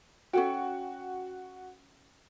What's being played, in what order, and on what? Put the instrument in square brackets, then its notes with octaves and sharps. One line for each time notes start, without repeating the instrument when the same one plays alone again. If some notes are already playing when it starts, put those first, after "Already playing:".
[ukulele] C#4 A4 G5 [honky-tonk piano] F#4